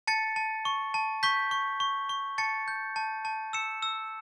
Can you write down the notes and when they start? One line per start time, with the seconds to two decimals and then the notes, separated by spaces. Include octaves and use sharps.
0.07 A5 A6 C#7
0.36 A5
0.65 C#6
0.94 A5
1.23 C#6 G6 B6
1.51 C#6
1.80 C#6
2.09 C#6
2.38 A5 A6 C#7
2.68 G6
2.96 A5
3.25 A5
3.53 E6 C#7 E7
3.82 E6